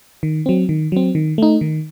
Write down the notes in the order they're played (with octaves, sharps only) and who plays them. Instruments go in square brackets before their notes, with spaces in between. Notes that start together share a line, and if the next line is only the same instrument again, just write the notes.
[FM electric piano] D#3
F#3 C4
D#3
F#3 C4
D#3
A3 D#4
D#3